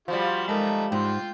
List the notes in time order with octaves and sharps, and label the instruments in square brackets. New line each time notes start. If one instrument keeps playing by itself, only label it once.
[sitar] F3 G3 [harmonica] F4 F#4
[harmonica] D#3 A3 D#4 [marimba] G#3 A#4
[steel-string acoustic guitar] G#2 [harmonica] F4 G5 C6